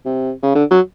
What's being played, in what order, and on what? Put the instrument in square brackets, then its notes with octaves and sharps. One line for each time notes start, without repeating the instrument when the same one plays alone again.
[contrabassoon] C3
C#3
D3
F#3